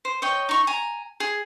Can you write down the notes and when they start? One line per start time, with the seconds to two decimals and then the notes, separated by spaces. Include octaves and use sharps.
0.05 C5
0.22 C#5 D#5 G5
0.49 D#4 C#6
0.67 G#5 A#5
1.20 G#4